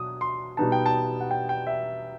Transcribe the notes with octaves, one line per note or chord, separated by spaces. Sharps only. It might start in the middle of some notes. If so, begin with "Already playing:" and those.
Already playing: B2 F#3 D#6
C6
B2 G3 B3 D#4 A5
G5
A5
F#5
G5
G5
E5